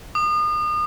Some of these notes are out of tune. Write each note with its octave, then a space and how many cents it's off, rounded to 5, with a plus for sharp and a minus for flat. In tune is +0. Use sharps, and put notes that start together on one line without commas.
D#6 -35